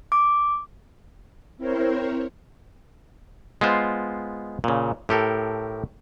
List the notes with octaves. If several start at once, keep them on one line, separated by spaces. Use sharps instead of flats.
D6
C4 E4 A#4 C5 C#5
G#3 B3 F4 C5
A#2 C#3
A2 G4 A4 A#4